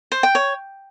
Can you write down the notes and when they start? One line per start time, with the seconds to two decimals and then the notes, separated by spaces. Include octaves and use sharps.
0.12 C5
0.23 G5
0.35 C#5